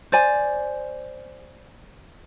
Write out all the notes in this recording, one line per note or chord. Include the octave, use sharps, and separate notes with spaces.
C5 D5 G#5